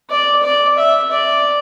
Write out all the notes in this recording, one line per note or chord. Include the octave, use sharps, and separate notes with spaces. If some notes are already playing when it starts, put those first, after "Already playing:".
D5
D5
E5
D5